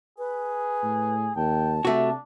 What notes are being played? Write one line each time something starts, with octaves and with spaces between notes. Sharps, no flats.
G#4 B4
A2
D#2 G5 A5
C3 A3 D4 F#4